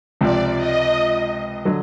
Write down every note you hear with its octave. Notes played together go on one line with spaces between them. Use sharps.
C#2 C3 F3 D5
D#5
D3 F#3